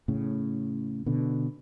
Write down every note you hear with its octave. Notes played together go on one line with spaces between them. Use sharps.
A2 C#3
B2 D3